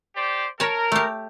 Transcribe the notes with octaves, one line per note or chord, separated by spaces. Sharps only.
G4 C5 D5
A#4 C#5 A5
A3 G4